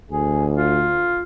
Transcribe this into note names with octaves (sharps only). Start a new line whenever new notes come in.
D2 G#4
F4